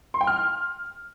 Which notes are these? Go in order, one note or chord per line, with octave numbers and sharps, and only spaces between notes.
C6
G5
F6